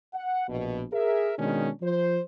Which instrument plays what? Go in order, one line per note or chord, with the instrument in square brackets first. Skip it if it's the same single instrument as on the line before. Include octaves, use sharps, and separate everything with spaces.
[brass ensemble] F#5
A#1 B2
G#4 A#4 E5
B2 D#3 G#3 C#4 D4
F3 C5